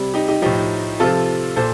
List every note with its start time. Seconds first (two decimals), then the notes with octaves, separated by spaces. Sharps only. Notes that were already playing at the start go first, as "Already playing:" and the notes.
Already playing: C3 G3
0.14 D#4 G4
0.28 D#4 G4
0.42 A2 F3 D#4 G4
1.00 C3 F3 F4 A4
1.56 A#2 A4 C5